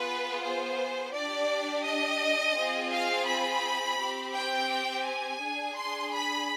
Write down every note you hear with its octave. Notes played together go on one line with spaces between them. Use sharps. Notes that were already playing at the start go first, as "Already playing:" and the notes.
Already playing: B3 F4 G#4 B4
C5
D4 G4 D5
D#5
C4 F4 G#4
F5
B5
C4 G4
G5
G#5
D4 G#4
C6
B5